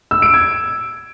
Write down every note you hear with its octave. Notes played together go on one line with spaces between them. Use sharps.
E6
D7
G#6